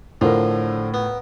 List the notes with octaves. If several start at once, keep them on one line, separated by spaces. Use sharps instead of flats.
A2 D3 F3 F4 A#4
B3